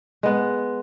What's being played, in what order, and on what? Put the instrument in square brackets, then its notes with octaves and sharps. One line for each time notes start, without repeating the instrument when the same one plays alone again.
[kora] G#3 B3